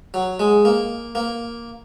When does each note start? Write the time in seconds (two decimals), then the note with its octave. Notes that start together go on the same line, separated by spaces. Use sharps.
0.14 F#3
0.40 G#3
0.65 A#3
1.15 A#3